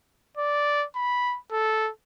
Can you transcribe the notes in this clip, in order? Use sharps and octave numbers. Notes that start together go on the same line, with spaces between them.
D5
B5
A4